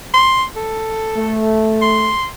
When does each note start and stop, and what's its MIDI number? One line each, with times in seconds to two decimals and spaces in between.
0.14 0.44 84
0.56 1.46 69
1.17 2.14 57
1.81 2.26 84